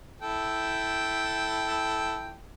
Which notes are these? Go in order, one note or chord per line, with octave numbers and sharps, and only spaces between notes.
E4 A4 G5